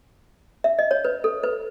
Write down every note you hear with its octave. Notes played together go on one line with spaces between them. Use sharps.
E5
D#5
C#5
B4
A4
B4